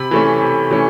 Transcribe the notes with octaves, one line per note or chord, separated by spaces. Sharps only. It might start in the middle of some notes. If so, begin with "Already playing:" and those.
Already playing: C3 B5
E3 A3 C#4
C3
E3 A3 C#4